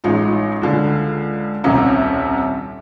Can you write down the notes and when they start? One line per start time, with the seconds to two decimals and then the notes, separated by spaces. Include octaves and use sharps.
0.04 A1 G#3 D#4 F4
0.62 C#2 D3
1.64 D#1 C2 C3 C#4 A#5